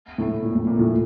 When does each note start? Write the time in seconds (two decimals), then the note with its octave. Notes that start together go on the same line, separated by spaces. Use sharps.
0.18 A2
0.42 A#2
0.55 A2
0.67 A#2
0.79 A2